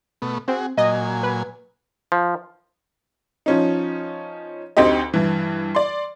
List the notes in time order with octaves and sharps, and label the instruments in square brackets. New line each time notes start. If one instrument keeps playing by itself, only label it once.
[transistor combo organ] B2 A3 B3
[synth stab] C4 [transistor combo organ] F#4 G#4
[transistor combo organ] A#2 F#3 G#5 [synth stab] D#5
[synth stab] B4
[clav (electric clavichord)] F3
[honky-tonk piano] F3 C#4 D#4
D2 C4 D#4 G4 D#5
G2 E3
D5 C6